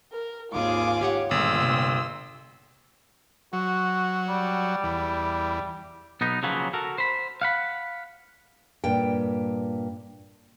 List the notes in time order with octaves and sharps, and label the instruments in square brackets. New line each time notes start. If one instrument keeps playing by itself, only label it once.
[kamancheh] A#4
[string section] G#1 D#2 G#4 [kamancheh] F4 D6
[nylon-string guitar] G4 C#5 F#5
[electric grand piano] G1 [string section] A#2 G#3 C6 [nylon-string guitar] D#3 [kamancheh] E6
[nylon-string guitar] C3
[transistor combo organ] F#3 [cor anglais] F#4
[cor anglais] G3
[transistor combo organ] E2
[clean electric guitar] B1 B3 D#4
C#3 F3 F#3 A#3 B3
F#4 A4 A#4
C5 B5
F5 F#5 B5
[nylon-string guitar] G2 A#2 G5